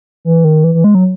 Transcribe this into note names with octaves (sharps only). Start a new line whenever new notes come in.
E3
D#3
E3
E3
G#3
F#3